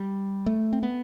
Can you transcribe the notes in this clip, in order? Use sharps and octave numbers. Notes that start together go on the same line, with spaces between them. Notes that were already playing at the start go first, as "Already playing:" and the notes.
Already playing: G3
A3
C4
B3